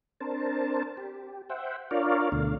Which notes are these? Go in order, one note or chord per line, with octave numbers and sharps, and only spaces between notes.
C4 D4 A#4 C5 A5
G4
C5 E5 F#5 G5
D4 F4 A#4 C#5 D5 F5
D2 B2 D3 A3 F5